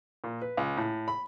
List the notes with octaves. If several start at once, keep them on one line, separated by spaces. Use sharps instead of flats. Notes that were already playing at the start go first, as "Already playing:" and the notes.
A#2
B4
C#2
A2
B5